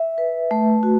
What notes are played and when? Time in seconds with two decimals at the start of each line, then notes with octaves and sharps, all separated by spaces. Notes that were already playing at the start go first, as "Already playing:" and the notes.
Already playing: E5
0.18 B4
0.51 A3
0.83 F#4